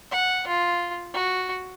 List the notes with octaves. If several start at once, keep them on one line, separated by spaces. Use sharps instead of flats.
F#5
F4
F#4